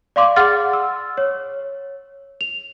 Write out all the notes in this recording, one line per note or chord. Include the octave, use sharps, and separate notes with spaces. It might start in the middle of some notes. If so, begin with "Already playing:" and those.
D5 F5 C6 D6
G#4 F#5 C6 F6 A6
E6
C#5
F7